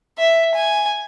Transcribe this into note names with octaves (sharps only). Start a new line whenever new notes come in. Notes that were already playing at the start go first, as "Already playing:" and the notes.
E5
G#5